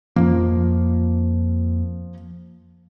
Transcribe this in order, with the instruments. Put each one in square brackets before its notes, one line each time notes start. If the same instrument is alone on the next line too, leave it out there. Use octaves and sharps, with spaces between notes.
[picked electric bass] F2 A#3 [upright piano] F3